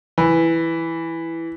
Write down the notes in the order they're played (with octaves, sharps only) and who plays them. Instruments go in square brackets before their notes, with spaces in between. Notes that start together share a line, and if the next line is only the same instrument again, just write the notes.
[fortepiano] E3